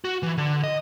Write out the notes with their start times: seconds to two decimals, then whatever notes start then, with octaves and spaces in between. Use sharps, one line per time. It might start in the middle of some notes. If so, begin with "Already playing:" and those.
0.04 F#4
0.23 E3
0.38 D3
0.64 D#5